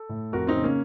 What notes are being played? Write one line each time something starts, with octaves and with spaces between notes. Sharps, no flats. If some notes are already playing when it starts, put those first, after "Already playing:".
Already playing: A4
A2
F2 F#4 A#4
C4 D#4
C#3
A#3 C#4